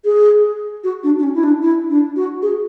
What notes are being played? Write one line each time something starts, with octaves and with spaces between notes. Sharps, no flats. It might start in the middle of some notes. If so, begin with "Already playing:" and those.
G#4
F#4
D4
D4
C#4
E4
D4
E4
D4
F#4
G#4